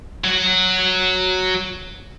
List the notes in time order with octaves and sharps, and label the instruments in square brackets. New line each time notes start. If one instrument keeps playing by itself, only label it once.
[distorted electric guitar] F#3 F#4